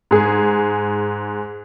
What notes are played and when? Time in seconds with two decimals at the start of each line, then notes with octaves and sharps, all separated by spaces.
0.11 G#2 G#4